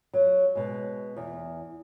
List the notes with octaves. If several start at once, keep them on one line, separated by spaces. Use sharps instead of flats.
F#3
B2 G#3
E2